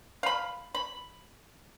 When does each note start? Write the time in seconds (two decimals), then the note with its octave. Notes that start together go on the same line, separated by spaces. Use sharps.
0.23 F5 B5
0.75 B5